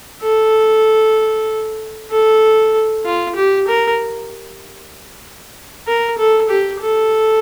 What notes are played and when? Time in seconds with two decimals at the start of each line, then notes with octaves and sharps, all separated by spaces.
0.23 A4
2.10 A4
3.05 F4
3.36 G4
3.68 A#4
5.87 A#4
6.18 A4
6.49 G4
6.81 A4